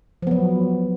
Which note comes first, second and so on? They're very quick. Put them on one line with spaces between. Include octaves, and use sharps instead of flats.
F3 B3 F#3